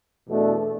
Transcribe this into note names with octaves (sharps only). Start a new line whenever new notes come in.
E2 B2 A3 D4 A4